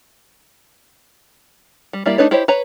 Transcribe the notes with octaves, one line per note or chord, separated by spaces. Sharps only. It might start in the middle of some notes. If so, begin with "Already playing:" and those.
G3
G3 A#3 E4 D5
A3 D4 D#4 B4 C#5
E4 G4 C5 C#5 D#5
B4 C#5 A#5